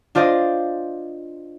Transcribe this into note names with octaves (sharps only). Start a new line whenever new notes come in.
D4 F4 C5 D5 D#5